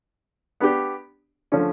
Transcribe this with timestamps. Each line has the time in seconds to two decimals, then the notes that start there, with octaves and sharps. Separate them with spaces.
0.60 B3 D4 G4
1.52 D3 F3 A3 C#4